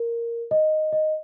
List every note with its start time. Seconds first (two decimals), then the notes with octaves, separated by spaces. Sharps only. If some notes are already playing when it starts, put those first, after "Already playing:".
Already playing: A#4
0.51 D#5
0.92 D#5